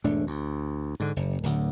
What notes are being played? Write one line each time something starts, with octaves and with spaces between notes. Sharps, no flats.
E1 G#2 A3 D4
D2
G#2 D3
F#1
D1 D2